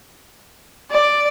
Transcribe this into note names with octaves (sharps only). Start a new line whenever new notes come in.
D5